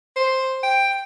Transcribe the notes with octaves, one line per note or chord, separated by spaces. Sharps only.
C5
G5